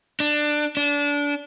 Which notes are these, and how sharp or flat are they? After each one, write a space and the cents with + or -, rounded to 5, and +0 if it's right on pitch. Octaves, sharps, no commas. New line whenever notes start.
D4 +15
D4 -25